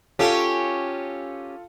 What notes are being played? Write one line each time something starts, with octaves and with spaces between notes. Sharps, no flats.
C#4 F4 G4 A4 F5